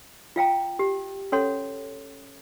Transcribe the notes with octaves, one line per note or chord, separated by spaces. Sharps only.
F4 F5 G5 A#5
G4
C#4 A4 C#5 F#5 C6